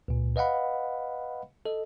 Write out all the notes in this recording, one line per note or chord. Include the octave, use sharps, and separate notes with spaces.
C#2 A#2
B4 D#5 F5 F#5 B5
A4 D#5